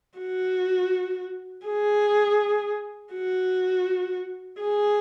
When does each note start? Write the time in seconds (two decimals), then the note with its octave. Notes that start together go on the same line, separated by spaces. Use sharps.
0.19 F#4
1.66 G#4
3.14 F#4
4.61 G#4